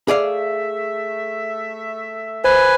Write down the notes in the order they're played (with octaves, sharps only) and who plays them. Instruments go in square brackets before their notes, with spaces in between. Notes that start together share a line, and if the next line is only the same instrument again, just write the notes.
[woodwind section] A3 E5 [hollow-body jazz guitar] G#4 D5 F5
[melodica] B4 G#5 [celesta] C5